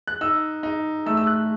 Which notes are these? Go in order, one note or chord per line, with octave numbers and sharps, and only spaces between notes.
F#6
D#4 E6
D#4
A3 E6
E6
F#6